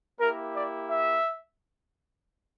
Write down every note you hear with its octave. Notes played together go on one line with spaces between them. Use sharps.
A#3 E4 G4 A#4
D5
E5